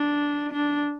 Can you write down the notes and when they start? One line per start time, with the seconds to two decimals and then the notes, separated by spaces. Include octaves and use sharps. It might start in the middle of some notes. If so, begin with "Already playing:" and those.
Already playing: D4
0.53 D4